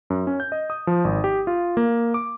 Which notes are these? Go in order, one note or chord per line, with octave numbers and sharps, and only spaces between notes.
F#2
C#4
G6
D#5
D#6
F3
G#1
G4
F4
A#3
D6